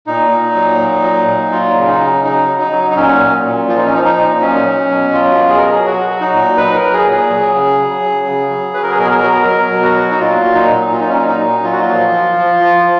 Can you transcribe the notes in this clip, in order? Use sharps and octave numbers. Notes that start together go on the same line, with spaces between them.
A#2 D#4
A#2
F#3
A#2
F#3
A#2
F#3 F4
C#3
D#4
C#3
F#3 D#4
F#3
D#4
F#3
D#4
A#2 C#4
A#2
A#2
F3 F4
D#4
C#4
F3 D#4
D#4
A#2
F#3 C#4
F#3
B2
F#3 F4
B2
G#4
F#3 A#4
G#4
F#3 F#4
F#3
D#4
A#2
F#3 B4
A#4
F#3
G#4
A#2
G#4
F#3
C#3
F#3
F#3
C#3
F#3
F#3 B4
A#4
G#4
B2 A#4
G#4
A#4
F#3
F#3 A#4
B2
F#4
F#3
D#4
A#2 F4
F#3
D#4
A#2
A#2 F4
D#4
C#4
F#3 D#4
D#4
F#3
A#2 F4
F#4
F4
F3
F3
F3
F3
F3